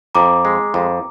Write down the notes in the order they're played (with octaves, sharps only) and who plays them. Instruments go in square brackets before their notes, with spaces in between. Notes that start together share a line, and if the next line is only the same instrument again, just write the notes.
[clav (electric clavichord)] F2 [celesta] A#5 D6
[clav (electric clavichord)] G#3
F2